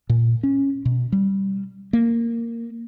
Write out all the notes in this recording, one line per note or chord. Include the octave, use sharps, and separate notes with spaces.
A#2
C#4
B2
G3
A#3